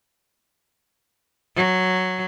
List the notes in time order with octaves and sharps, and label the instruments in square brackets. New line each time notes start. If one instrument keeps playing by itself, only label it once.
[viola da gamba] F#3